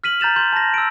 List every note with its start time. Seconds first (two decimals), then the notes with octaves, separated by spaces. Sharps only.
0.04 F6 B6 D#7 F#7
0.20 A#5 G6 A6 E7 F7
0.36 C6 G6 F#7
0.53 A5 A#6
0.74 E6 D7